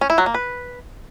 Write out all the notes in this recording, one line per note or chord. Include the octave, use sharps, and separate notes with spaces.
C#4
E4
F#3
A#3
B4